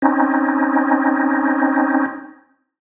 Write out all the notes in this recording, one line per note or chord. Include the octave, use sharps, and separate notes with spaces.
C4 C#4 D#4